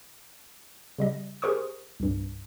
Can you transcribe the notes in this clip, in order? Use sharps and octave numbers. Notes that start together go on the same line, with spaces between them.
C#3 G3 D#5
G4 G#4 A#4 C5 C#6 D#6
C2 G2